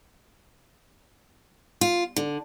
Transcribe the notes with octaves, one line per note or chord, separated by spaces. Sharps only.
F4
D3